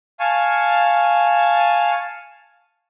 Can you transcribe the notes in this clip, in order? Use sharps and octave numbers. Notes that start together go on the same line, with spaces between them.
F5 G#5 A5 C#6